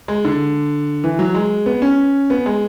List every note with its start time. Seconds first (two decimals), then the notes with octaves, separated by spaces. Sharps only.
0.08 G#3
0.25 D3
1.04 E3
1.19 F#3
1.35 G#3
1.66 B3
1.82 C#4
2.30 B3
2.46 G#3